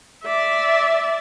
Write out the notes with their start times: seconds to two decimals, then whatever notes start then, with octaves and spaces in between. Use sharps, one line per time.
0.24 D5 E5